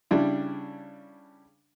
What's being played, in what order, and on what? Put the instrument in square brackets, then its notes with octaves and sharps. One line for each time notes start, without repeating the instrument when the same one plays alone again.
[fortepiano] C#3 G3 D4 E4